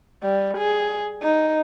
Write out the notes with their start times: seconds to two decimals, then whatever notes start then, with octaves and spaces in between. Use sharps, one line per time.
0.23 G3
0.57 G#4
1.22 D#4